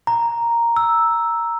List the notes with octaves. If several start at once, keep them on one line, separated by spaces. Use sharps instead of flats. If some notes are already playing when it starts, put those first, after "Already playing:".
A#5
E6